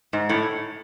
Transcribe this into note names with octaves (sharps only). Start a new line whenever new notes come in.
G#2
A2